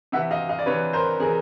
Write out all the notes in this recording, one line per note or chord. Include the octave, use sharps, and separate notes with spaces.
C3 E3 E5 F#5
D#5 F5
D#5 F5
D5
C3 E3 B4 C#5
A#4 C5
C3 E3 G#4 A#4